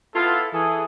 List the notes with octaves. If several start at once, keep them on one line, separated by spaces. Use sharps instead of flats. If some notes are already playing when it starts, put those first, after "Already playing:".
B3 E4 F4 A4
E3 G#4 A4